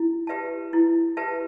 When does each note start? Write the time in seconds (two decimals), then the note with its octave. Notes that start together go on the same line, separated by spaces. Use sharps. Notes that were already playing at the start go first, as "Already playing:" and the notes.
Already playing: E4
0.27 G4 B4 E5 A5
0.73 E4
1.17 G4 B4 E5 A5